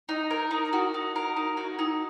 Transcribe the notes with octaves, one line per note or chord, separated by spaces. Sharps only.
D#4
A#4
D#4
F#4
D#4
A#4
D#4
F#4
D#4